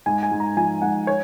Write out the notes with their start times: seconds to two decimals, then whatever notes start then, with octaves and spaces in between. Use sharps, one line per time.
0.06 G#2 G#5
0.23 G#5
0.31 G#2
0.40 A#5
0.57 F3 G#5
0.82 G#2 F#5
1.07 C#5